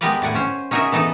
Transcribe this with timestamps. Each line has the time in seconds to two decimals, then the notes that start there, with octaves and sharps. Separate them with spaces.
0.01 G#3 B3 G4 A#4 B4 D5
0.22 A2 D5 F#5 G#5
0.35 C#4 C5
0.71 C#4 D#4 F#4 G#4 A#4 E5
0.92 E3 B3 D#4 A4 B4 A#5